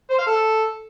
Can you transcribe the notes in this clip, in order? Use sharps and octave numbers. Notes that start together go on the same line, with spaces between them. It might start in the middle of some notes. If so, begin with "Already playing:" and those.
C5
F5
A4